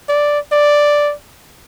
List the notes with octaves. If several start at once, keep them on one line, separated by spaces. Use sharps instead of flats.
D5
D5